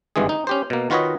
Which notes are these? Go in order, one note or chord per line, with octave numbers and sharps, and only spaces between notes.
G#1 G2 E3 G#3 G#4
D#4
C#4 G4 C5
B2 A#3
D#3 F4 F#4 B4 C#5 D#5